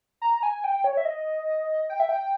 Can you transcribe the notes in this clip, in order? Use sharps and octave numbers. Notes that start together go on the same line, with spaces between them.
A#5
G#5
G5
C#5
E5
D#5
G5
E5
G5